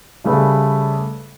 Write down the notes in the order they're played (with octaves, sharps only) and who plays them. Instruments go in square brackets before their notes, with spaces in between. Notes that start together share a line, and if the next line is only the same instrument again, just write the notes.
[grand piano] C#3 G3 A3 G#4 B4